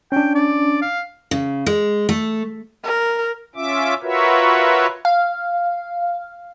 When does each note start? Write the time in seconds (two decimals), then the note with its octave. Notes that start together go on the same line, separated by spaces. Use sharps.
0.12 C#4 D4 G5
0.35 D5
0.82 F5
1.31 C#3
1.66 G#3
2.09 A3
2.83 A#4
3.56 C#4 F4 E5 D6
4.02 F4 F#4 A#4 B4 C#5 E5
5.05 F5